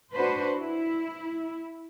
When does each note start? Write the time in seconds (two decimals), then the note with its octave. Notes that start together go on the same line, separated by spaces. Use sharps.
0.15 D4 F#4 B4 C5
0.60 E4